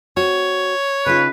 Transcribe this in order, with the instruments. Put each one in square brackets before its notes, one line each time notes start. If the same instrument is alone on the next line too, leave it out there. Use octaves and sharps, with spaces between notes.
[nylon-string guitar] C4 F#4 [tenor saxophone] C#5
[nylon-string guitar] C#3 D#4 F4 [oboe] B4